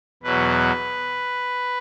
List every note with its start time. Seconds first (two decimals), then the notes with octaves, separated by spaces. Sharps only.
0.23 E2 B2 F#3 B4